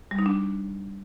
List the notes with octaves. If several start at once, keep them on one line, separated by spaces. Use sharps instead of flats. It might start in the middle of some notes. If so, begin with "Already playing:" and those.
G3
D#4
D4